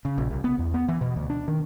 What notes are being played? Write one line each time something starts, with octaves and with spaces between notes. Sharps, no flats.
C#3
A#1
C2
B3
E2
B3
E3
B2
D2
D4
D#3